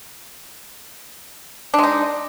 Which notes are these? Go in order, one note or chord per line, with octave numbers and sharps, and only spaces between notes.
G#3 D4 D#4